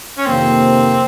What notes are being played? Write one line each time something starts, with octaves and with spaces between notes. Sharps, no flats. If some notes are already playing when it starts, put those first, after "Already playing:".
C#4
F2 C3 D#3 A#3 C4